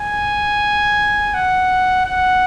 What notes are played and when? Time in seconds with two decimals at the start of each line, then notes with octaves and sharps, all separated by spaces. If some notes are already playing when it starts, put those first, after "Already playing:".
Already playing: G#5
1.34 F#5
2.05 F#5